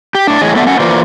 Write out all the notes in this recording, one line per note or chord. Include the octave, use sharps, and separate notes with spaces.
G4
A2 D4
A2 E3 G#4 C#5 D#5
B3 A4 D5 E5 F#5 A5
A3 C#4 F#5
E3 A#3 F4 C5 D5